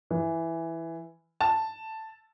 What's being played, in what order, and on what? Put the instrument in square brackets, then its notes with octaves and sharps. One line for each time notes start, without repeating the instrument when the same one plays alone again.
[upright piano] E3
A5